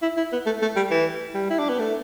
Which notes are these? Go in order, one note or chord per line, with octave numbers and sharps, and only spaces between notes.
E4
E4
B3
A3
A3
G3
E3
G3
E4
D4
B3
A3